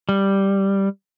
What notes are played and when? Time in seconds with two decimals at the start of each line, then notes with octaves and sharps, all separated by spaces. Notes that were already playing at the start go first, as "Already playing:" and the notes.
0.09 G3